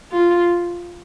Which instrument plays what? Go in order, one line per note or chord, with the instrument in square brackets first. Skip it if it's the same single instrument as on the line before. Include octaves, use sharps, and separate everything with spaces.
[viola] F4